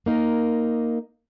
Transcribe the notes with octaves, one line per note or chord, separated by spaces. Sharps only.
A#3 D#4 A#4